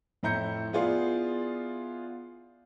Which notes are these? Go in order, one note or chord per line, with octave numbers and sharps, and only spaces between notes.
F2 A2 E4 A#5 G6 C#7
B3 E4 F4 G#4 D5 F5